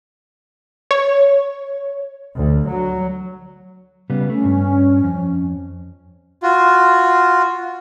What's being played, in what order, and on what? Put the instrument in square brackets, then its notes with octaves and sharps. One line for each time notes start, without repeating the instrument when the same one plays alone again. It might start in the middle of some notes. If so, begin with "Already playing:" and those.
[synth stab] C#5
[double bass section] D2
F#3
[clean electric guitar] C#3 G3 B3
[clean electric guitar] A3 [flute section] C#4
[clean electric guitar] G2
F2
[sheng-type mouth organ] F4 F#4